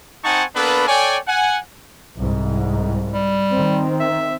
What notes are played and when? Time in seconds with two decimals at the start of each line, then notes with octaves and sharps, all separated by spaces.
0.24 C4 D#4 F#5 G#5 A5 C#6
0.55 A#3 B3 D4 A4 B4
0.88 A4 C#5 D5 G5 G#5
1.28 F#5 G#5
2.16 C2 G#2
3.13 G3
3.52 D#3 C4
4.00 E5